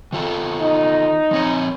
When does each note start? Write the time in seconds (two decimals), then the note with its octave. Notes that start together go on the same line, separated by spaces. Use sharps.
0.12 D#3 F4 A4
0.60 D#4
1.31 F3 C4 C#5